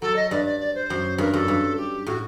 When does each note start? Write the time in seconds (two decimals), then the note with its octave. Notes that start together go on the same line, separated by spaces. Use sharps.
0.02 F#3 A4
0.16 D#5
0.31 G2 D5
0.45 D5
0.60 D5
0.75 C5
0.90 F#2
1.18 G2 A#4
1.33 F#2 A4
1.48 G2
1.77 G4
2.06 A2 F#4